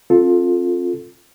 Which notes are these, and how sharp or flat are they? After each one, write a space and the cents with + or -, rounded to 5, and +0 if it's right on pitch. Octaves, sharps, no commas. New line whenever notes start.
C4 +45 F4 +15 A4 +0